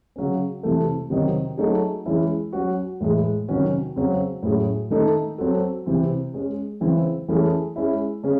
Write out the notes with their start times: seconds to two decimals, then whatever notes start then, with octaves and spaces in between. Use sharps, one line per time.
0.16 C#3 F#3 C#4
0.63 C3 E3 A3
1.10 C3 D#3 F#3 C4 D#4
1.57 F#3 A3 D#4 G#4
2.06 E3 G#3 C#4 E4
2.53 F#3 C#4 F#4
3.00 A2 E3 G#3
3.48 C3 D#3 F#3 C#4 F#4
3.96 C#3 F#3 C4
4.43 A2 F#3 C#4 G#4
4.90 D#3 A3 D#4 A4
5.38 F#3 C4 F#4 A4
5.86 C3 E3 C4
6.34 G#3 C#4 G#4
6.80 C#3 E3 C4
7.28 E3 A3 C#4 G#4
7.76 G#3 C#4 E4
8.23 C#3 G#3 C#4